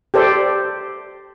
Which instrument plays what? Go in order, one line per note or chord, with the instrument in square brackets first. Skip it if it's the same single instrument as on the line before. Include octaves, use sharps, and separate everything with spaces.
[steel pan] G4 A4 C5 D5